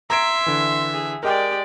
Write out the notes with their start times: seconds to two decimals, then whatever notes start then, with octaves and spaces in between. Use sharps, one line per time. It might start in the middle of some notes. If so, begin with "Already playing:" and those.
0.10 E5 A#5 C6 G#6 D7
0.46 D3 E3
0.93 G#4
1.23 G#3 G4 A#4 D5 D#5 G5